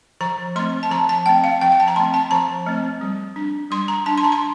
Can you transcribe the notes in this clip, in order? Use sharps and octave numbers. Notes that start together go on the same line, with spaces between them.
F3 A#5
A3 C4 C6
A5
F3 A#5
A5
A3 C4 G5
F5
F3 G5
G5
A5
A#5
A3 C4 C6
A5
F3 A#5
A3 C4
G3
D4
G3 C6
A#5
D4 A5
C6
A#5
C6